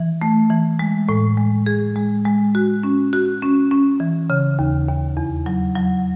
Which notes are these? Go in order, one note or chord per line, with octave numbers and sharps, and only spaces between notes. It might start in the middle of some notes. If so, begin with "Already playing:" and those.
Already playing: E3
A3
E3
G#3
A2
G#3
G#4
G#3
G#3
F#4
C#4
F#4
C#4
C#4
E3
C#3
D#2
D#2
E2
F#3
F#3